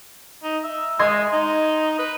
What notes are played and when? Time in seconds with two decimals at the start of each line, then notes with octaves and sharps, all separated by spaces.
0.43 D#4
0.64 E5
0.99 G#3 D#5 C6 G#6
1.32 D#4
1.99 B4